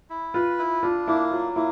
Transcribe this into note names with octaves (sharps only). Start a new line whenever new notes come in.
E4
F4 B4
E4
D4 F4
A#3 E4
F#3 F4
A#3 E4